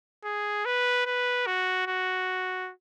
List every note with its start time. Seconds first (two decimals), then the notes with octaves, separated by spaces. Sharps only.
0.24 G#4
0.65 B4
1.06 B4
1.47 F#4
1.87 F#4